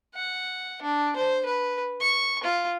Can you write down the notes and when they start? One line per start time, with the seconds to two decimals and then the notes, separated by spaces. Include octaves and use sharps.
0.15 F#5
0.82 D4
1.16 C5
1.46 B4
2.01 C#6
2.44 F4